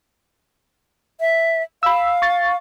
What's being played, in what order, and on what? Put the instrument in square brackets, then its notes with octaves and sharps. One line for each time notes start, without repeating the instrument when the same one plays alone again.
[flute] E5
[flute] F5 [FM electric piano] B5 E6
[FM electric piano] C#6 A6